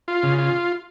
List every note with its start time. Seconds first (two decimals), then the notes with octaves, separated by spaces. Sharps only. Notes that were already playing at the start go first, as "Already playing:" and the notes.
0.08 F4
0.23 C#3
0.38 F4